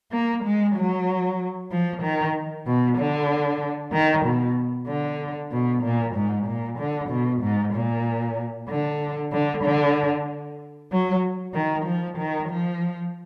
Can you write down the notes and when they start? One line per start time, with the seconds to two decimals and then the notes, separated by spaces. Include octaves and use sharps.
0.12 A#3
0.44 G#3
0.76 F#3
1.71 F3
2.02 D#3
2.66 B2
2.97 D3
3.92 D#3
4.25 B2
4.87 D3
5.52 B2
5.83 A#2
6.16 G#2
6.46 A#2
6.79 D3
7.10 B2
7.42 G#2
7.73 A#2
8.69 D3
9.32 D3
9.64 D3
10.91 F#3
11.54 D#3
11.85 F3
12.18 D#3
12.49 F3